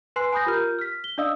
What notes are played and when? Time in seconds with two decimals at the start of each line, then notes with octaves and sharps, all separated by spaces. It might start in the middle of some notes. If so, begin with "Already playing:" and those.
0.16 B4 G#5 C6 F#6 C7
0.33 G#5 B5 D#6 G6 A#6
0.46 F4 G4 A#4 F6 G6
0.79 F6 B6
1.04 G7
1.18 D4 D5 D#5 F5 D#6 E6